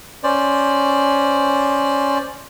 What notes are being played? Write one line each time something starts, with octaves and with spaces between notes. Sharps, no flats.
C#4 C5 D5